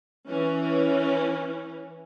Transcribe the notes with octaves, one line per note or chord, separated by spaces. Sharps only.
E3 C#4